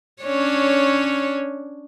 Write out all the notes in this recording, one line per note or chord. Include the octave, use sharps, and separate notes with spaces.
C#4 D4 C#5